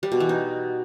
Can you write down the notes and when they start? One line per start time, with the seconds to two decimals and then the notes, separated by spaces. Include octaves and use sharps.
0.03 G3
0.12 B2
0.20 E3
0.29 D#4